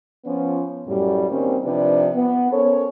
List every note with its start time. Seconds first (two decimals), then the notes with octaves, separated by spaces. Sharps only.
0.25 F3 B3 C#4
0.87 F#2 A2 G3
1.29 D#3 G3 A#3 C4 C#4
1.64 C3 F3 D4 D#4 B4 D5
2.15 B3
2.52 C#4 A4 A#4 C5 C#5